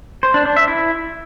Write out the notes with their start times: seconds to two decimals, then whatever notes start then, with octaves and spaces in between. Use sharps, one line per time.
0.23 C5
0.34 D4
0.45 D4
0.56 E5
0.68 E4